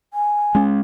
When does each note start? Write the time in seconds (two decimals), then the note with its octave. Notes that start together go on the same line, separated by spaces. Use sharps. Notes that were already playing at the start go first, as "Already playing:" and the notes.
0.14 G#5
0.55 G#3 C#4